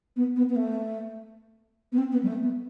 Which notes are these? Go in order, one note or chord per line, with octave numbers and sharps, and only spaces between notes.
B3
B3
B3
A3
B3
C4
B3
G3
A3
B3